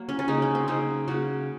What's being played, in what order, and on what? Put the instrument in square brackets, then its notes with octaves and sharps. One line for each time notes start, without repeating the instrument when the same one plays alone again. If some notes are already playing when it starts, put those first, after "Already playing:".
Already playing: [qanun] F#3 A#3
C#4
C#4
C#3 F#3 A#3 D#4
C#4
C4
C#3 F#3 A#3 D#4
C#3 F#3 A#3 F#4